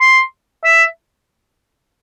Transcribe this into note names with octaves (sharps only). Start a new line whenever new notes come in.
C6
E5